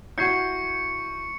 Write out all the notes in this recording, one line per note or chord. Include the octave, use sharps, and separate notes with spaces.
E4 F#4 C#6 G6 G#6 C7 C#7